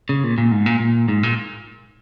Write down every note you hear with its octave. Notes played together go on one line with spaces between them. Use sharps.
C#3
A#2
A#2
G#2
A#2
A#2
G#2
A#2